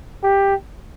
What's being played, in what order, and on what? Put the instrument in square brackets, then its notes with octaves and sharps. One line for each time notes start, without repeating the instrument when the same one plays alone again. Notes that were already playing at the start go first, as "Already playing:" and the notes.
[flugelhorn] G4